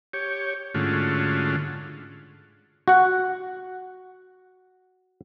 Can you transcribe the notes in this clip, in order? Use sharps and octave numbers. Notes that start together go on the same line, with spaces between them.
G4 C#5
G#2 D3 A3 C#4 F4 F#4
F#4 F#5